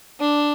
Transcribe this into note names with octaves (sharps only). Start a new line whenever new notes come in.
D4